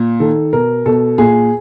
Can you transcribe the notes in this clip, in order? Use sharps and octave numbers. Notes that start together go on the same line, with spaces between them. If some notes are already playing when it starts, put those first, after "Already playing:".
Already playing: A#2
D#3 A4
B2 A#4
B2 A4
A#2 G#4